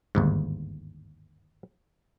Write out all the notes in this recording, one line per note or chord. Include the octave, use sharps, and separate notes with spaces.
G1 D#2 G#2